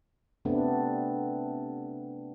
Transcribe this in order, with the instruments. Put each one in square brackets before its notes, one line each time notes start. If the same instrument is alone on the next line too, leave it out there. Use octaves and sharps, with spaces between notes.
[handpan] C3 A3 B3 C4 D4